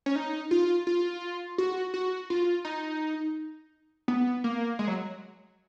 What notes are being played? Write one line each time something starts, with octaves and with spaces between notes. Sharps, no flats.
C#4
D#4
F4
F4
F#4
F#4
F4
D#4
B3
A#3
G#3
F#3